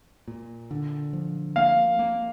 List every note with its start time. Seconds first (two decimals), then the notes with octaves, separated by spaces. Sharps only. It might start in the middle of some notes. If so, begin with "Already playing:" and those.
0.28 A#2
0.71 D3
1.13 F3
1.56 A#3 F5
1.99 A#3